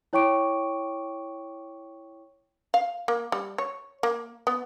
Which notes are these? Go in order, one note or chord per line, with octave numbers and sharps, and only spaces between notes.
E4 C#5 G5 C#6 D6 D7
F5
A#3
G3
C#5
A#3
B3